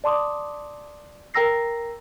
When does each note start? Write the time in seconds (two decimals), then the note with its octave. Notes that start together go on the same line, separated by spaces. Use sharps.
0.04 D5 A5 C6 D6 D#6
1.34 A#4 G5 A#5 E6 A#6 C7